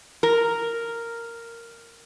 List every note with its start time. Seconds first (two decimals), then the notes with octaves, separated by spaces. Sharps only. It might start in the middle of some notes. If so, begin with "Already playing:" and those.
0.23 A#4